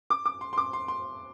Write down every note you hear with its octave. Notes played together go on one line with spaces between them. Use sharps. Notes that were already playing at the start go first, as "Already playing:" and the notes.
D6
D6
C6
C6
D6
C6
C6